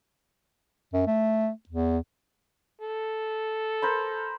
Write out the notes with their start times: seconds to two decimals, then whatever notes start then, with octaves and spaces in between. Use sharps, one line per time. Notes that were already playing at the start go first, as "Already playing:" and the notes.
0.93 F#2
1.07 A3
1.69 E2
2.81 A4
3.82 A#4 C5 B5